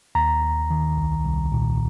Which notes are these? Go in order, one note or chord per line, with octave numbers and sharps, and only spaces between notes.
D#2 A#5
D#2
D#3
C2
C2
A#2